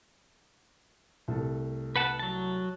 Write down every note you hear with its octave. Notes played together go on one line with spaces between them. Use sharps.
C2 A3 A4
B4 F#5 A5
F#3 A5